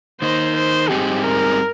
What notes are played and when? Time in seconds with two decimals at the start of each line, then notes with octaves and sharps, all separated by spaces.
0.21 D#3 A#3 D#4 C5
0.56 C5
0.89 G#2 G3 C4 D#4 G4 G#4
1.23 A#4